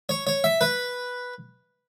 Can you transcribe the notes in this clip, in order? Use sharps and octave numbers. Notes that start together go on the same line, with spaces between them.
C#5
C#5
E5
B4